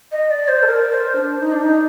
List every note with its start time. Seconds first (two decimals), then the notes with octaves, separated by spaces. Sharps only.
0.11 D#5
0.30 D5
0.48 C5
0.62 A4
0.67 A#4
0.91 C5
1.15 D4
1.39 D#4
1.51 D4
1.63 D#4